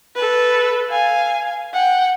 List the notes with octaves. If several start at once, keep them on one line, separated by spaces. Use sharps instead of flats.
A4 B4
F5 G#5
F#5 G5